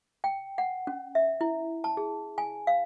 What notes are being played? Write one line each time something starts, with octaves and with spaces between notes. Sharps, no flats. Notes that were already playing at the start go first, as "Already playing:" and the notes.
G5
F#5
C#4
E5
E4
A5
G#4
G#5
F5